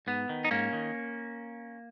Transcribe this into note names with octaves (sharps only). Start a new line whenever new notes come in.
G#2 B3
D#3
D#4
G#2 A#3 C#4
D#3